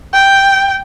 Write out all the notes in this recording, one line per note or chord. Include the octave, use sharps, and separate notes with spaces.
G5